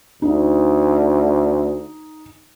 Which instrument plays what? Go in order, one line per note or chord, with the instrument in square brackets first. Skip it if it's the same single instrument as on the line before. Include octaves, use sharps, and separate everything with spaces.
[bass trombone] D2 [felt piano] D#4